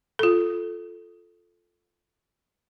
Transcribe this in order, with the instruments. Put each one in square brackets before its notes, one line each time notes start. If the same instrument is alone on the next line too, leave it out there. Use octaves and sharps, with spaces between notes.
[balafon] F4 A4